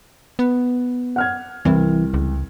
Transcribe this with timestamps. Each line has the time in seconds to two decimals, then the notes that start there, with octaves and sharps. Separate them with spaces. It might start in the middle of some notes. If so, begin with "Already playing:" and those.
0.39 B3
1.16 F#5 F6 G#6
1.65 C2 E3
2.14 C#2